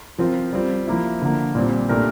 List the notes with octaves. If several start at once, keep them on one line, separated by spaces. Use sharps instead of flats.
F3 C4 F4 A#4
G3 C4 F4
F3 A#3 E4
D3 F3 A#3
A#2 G3 C4
A#2 A3 D4 G4 A#4